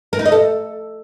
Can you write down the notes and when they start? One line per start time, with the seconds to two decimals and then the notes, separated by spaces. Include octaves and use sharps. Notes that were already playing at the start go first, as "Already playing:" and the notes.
0.13 A#4
0.19 D#4
0.25 D#5
0.32 A4